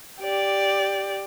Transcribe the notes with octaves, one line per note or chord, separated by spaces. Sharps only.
G4 D5